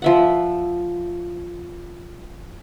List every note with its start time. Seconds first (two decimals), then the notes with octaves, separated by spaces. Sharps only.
0.02 F3 E5 F#5